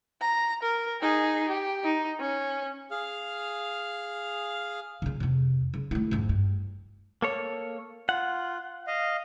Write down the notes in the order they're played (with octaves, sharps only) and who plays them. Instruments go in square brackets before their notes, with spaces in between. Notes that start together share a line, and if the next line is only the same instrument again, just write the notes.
[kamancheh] A#5
A#4
D#4 G#4
G4
D#4
C#4
[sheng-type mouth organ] G#4 F5 F6
[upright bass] C#3 F4
F2 C3
C#3
A3 E4
F2 G#2
G2
[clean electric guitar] A#3 A4 C#5
[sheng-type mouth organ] F4 [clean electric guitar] F#5
[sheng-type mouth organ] D#5 F5